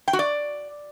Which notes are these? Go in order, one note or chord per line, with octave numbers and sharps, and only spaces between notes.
G5
F#4
D5